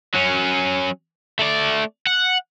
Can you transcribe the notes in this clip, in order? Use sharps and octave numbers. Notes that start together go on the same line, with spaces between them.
F#3 C#4
A3 D5
F#5